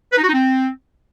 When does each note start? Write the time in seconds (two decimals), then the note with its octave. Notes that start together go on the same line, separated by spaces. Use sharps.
0.13 B4
0.18 D#4
0.23 F#4
0.28 D#4
0.34 C4